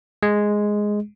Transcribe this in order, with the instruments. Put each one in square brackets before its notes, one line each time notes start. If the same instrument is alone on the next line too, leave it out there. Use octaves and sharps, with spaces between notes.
[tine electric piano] G#3